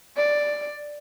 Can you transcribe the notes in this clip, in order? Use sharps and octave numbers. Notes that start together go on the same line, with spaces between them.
D5